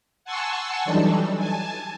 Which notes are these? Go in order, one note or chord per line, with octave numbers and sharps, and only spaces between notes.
F#5 G#5 A5 C6 C#6 E6
E3 F#3 G3 D4 D#4 A4
G#5 A5